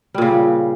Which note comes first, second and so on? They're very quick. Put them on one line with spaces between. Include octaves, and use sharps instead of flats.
G3 A#2 C#3